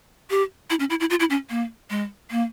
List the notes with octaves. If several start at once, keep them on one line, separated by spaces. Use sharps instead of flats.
G4
E4
C#4
E4
E4
F4
E4
C#4
A#3
G#3
A#3